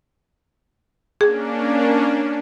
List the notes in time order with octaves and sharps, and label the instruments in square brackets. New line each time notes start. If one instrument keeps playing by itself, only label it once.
[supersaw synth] A#3 C#4 D4 [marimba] G#4